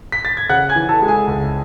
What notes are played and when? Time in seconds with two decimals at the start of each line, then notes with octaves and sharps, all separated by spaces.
0.12 B6
0.25 A6
0.37 G#6
0.49 C#3 F#5 F#6
0.69 G#5 G#6
0.76 E3
0.89 A4 A5
1.02 G#3
1.08 G#4 G#5
1.27 C#2